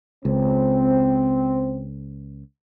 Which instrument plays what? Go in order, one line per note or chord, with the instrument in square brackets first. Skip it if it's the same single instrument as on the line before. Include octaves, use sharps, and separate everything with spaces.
[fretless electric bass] C#2 [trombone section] C4